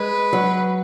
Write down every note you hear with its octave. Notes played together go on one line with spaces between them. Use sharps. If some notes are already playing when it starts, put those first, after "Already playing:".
Already playing: G#3 B4
F#3